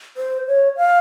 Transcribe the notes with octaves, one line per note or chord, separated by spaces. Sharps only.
C5
C#5
F5